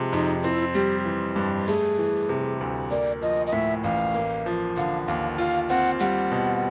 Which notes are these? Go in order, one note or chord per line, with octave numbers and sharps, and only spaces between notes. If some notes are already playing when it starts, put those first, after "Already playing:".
Already playing: C3 F3 G#3
F2 D#4
C4 E4
G3 G4
E3
G2
A3 G#4
E3
C3
D2
A#3 D5
F3 D#5
D#5
A2 E5
A1 F5
A#3
F3
D3 F5
D#2 F5
F4 F5
C4 F#5
G3 F#5
B2